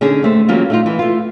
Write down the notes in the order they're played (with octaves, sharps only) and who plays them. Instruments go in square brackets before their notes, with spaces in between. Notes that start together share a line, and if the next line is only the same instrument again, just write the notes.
[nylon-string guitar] D3 C#4 D#4 G#4
D#2 A3 C5
E3 F#3 G3 A#3 C#4 F4
A3 D#4 F4
E3
A3 F4